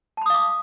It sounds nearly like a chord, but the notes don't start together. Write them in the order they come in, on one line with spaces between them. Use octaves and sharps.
A5 B5 D#6 F5 D6